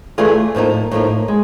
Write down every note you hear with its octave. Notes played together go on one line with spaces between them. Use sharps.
E3 A3 D4 F4 G#4
A2 F3 A#3 D#4
A2 F3 A#3 D#4
G#3